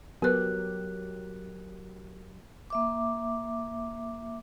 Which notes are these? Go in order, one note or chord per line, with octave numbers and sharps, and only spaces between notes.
F#3 B3 G4 A#4 B4 F#6
A#3 E5 D6